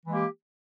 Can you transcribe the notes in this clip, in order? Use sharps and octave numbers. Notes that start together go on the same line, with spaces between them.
E3 G#3 A#3 G4